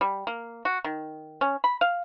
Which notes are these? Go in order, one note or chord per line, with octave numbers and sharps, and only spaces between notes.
G3
A#3
F#4
D#3
C#4
B5
F5